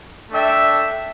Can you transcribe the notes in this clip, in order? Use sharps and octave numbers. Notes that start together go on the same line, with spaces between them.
A3 D4 A4 E5 G5